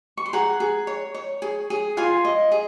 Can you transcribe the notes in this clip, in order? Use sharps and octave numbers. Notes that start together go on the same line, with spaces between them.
C#6
C6
G#4 F#5 A#5
G#4
C#5
C#5
G#4
G#4
F4 G#5 C6
D#5
G#4